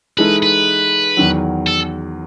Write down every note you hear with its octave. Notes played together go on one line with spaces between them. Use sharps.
E3 G#3 D#4 A4 B4
B4
E2 D#3 F#3
A4